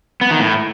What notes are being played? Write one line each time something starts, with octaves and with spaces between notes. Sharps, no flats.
B3
D#3
A2